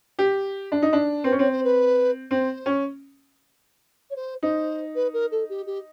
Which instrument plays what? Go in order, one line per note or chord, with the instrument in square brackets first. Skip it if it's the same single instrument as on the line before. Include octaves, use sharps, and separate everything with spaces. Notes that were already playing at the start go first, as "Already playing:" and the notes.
[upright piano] G4
D4
D#4
D4
[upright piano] C4 [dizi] B4
[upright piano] C#4
[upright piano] C4 [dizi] C#5
[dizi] C5
B4
[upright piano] C4 [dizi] C5
[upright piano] C#4
[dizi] C#5
C5
[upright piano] D#4 [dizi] C5
[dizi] B4
A#4
A4
G4
G4